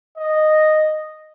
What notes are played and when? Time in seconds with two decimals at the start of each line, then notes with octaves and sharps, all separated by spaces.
0.18 D#5